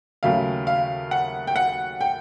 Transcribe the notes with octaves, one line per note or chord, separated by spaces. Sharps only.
D#2 C#3 F#3 A3 F5
F5
F#5
G5
F#5
G5